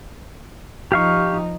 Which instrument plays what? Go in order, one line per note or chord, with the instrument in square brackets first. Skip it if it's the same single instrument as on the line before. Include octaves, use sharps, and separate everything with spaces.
[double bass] F3 D#4 [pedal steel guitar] G4 F5 C#6